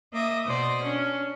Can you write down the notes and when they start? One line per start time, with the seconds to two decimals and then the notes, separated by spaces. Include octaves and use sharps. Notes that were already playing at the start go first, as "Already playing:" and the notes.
0.13 A#3 D#5 E5 D6 D#6
0.45 B2 C5 D5 D#5
0.84 C#4 D4